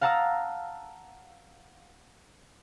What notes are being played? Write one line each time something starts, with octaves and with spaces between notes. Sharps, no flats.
F5 F#5 A5 A#5 D#6 E6